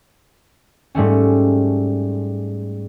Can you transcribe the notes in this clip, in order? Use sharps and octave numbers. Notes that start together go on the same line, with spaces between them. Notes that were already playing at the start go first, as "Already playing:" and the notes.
G#2 G3 A3 C#4